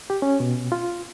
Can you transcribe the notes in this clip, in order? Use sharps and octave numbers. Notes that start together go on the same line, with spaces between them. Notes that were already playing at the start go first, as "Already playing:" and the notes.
G4
C#4
B2
F4